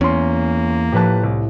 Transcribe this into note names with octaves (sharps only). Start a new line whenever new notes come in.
E2 A#3 C#4 C6
A2 F3 G4 B4 A5 F#6
C2